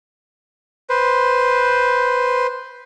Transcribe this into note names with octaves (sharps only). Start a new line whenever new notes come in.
B4 C5